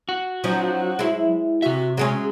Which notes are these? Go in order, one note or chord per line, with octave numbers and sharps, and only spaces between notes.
F#4
F3 F#3 C#4 D#4
G#3 E4
C3 F#4 E5
F#3 G#3 C#4 G#4